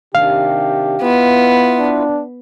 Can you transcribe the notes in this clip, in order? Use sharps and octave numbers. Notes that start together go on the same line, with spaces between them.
C3 D#3 D4 G4 F5
B3 E4 F4 B4
D4